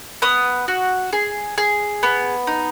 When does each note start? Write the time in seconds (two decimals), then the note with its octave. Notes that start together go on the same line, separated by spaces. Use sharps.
0.22 B3 D#6
0.68 F#4
1.13 G#4
1.58 G#4
2.03 B3
2.47 D#4